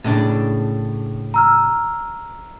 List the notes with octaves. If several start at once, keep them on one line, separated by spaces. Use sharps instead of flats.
A2 C#3 D4
A#5 E6 F6